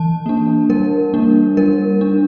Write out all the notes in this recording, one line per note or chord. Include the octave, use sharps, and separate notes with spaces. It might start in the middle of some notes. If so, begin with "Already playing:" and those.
Already playing: E3 A5
A#3 D4
G3 A#4
A#3 D4
G3 A#4
D4